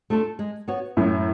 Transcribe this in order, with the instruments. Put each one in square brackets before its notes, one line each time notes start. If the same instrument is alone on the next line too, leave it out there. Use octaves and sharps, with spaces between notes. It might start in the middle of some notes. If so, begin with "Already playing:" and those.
[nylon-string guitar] A3 D4 F4 A4
G#3
B3 F#4 C#5
[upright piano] F#2 A2 [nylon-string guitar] G#3